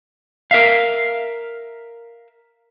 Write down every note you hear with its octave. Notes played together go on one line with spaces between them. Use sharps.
A#4 E5 F5